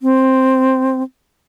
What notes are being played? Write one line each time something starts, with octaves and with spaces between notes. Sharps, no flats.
C4